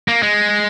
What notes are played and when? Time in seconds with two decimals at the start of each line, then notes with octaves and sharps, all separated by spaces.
0.08 A#3
0.23 G#3